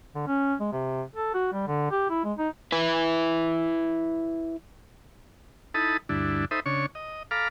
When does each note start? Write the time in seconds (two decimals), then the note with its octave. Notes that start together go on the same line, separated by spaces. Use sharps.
0.15 D3
0.27 C#4
0.60 G#3
0.72 C3
1.16 A4
1.34 F#4
1.53 G3
1.67 D3
1.91 G4
2.10 E4
2.24 G#3
2.38 D#4
2.72 E4 B4
5.74 D#4 E4 A4 A5 B5 D#6
6.09 D2 G2 D4 E4
6.51 D#4 A4 C5 E5 B5 D#6
6.66 C#3 D4 C#5 C#6
6.95 D#5
7.31 A4 F5 A#5 B5 D6 F6